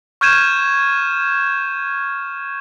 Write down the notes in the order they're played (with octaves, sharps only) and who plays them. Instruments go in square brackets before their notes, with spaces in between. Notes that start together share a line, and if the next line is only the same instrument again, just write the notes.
[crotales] C#6 F6 G6 G#6 D#7 E7